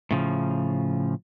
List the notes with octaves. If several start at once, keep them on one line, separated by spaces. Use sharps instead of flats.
A2 C#3 F3